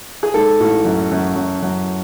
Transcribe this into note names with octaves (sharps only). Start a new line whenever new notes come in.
G#4
G#2 A4
A1
F#2
F#2
F#2
F#2